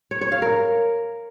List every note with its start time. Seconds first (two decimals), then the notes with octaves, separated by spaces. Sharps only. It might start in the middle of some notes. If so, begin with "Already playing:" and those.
0.11 C#5
0.21 C#5
0.32 F5
0.42 A#4